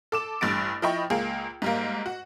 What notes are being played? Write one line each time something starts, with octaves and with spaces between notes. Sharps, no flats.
A4 D6 E7
A1 G2 A6 D7
F3 E4 D#5 G5 B5 C#6
C#2 A#3 G#4
G#2 G3 A#3
F#4